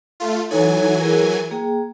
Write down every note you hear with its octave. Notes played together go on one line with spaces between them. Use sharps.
A3 F4
E3 F#3 D#4 A4 C#5 G#5
E4 G#4 A#4
A#3 G#4 G5